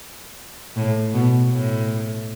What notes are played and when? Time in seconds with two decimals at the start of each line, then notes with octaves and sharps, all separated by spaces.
0.76 A2
1.14 B2
1.51 A2